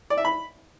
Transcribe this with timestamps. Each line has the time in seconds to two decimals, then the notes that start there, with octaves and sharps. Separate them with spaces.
0.10 D5
0.18 E5
0.25 B5